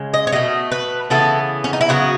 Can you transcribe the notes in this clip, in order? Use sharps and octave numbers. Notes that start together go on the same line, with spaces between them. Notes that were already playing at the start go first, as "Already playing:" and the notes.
Already playing: C#3 G#3
D#5
C#5
B2 F#3 A3 D#5
B4
C#3 E3 B3 A4
C#4
D#4
E4
C#3 F#3 B3 F#4